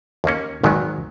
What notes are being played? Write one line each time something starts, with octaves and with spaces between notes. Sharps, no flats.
D#2 D#3 A#3 C#4
G#1 G#2 D#3 F#3 B3